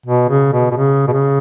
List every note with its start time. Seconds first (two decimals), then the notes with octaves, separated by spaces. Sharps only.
0.06 B2
0.29 C#3
0.53 B2
0.71 B2
0.76 C#3
1.08 B2
1.12 C#3